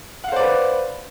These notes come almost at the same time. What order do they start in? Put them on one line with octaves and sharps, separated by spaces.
F#5 F5 C5 D5 B4